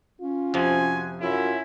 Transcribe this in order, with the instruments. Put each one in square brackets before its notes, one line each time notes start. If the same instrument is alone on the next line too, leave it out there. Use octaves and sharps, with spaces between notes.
[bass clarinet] C#4 [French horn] F4
[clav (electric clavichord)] F2 C3 F3 [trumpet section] F#4 C5 G#5
[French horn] F#2 [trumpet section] C#4 E4 [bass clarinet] F4